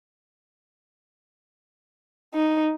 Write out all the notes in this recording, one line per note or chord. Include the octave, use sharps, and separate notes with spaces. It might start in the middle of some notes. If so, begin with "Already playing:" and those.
D#4